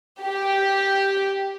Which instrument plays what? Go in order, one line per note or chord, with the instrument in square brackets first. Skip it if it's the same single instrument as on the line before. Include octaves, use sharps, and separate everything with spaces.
[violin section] G4